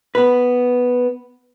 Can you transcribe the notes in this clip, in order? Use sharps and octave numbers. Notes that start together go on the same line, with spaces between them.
B3 B4